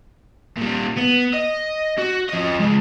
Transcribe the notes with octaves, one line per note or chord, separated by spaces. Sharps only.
A#2 G3
B3
D#5
F#4
F3 D#5
C#3 G#3